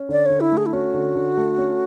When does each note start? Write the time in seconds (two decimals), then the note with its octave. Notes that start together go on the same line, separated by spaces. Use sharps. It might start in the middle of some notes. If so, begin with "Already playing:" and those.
Already playing: C#4
0.09 D3 D5
0.26 D3 C#5
0.41 E4
0.52 A3
0.57 G#4
0.66 E4
0.73 C#4 F#4
0.94 D3
1.16 D3
1.37 A3
1.58 C#4